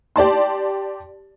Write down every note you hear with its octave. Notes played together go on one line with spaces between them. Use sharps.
G4 D5 A5 C6